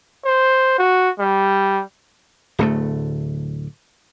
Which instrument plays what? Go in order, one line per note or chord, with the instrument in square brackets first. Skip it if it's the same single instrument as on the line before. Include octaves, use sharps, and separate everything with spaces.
[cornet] C5
F#4
G3
[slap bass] D1 D2 A3